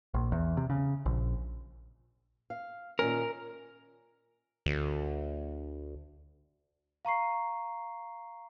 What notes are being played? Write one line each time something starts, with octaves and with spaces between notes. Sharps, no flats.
A#1
E2
C3
C#3
A#1
F5
A#2 D#3 C#4 A#4
D2
F5 A#5 C#6 C7